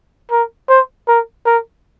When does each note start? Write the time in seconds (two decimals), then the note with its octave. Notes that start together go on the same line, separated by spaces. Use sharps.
0.31 A#4
0.69 C5
1.08 A#4
1.46 A#4